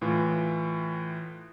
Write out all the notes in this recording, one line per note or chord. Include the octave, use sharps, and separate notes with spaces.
A2 E3 F4